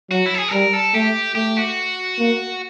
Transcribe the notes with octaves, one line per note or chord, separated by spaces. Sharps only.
F#3 F#4
E4
A4
G#4
A4
G3 A#4
A4
A3 G4
A3 G4
F#4
A#3